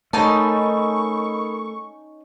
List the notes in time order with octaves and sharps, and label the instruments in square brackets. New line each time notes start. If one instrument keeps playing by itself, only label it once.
[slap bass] A3 [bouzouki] C#4 D#4 A5 [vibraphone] A#4 B5 D#6 [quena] C#6